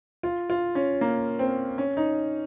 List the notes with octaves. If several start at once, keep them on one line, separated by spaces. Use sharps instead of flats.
F4
F4
C#4
A#3
C4
C#4
D#4